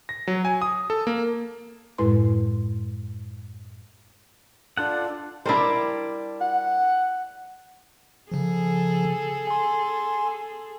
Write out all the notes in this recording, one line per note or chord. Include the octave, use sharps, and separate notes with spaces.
A#6
F#3
G#5
D#6
A4
A#3
F#2 A2 G#3 E4 B4 C6
D4 F4 A4 F#5
G3 D4 E4 A#4 C5
F#5
C#3 F3 G#4 A4
G#5 C6